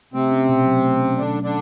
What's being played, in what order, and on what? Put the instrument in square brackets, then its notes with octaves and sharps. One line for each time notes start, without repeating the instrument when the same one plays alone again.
[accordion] C3 C4 [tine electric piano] A3
[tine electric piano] C#4
B2
F#3
A3
C#4
[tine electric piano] B2 [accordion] D3 D4
[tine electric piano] F#3
[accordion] D3 D4